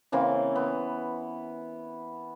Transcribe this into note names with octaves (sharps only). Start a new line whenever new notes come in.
C#3 E3 A#3 C4
B3